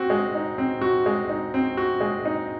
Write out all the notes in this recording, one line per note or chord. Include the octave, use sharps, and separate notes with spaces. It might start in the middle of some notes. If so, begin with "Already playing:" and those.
Already playing: C4 F#4
G#3
D#4
C4
F#4
G#3
D#4
C4
F#4
G#3
D#4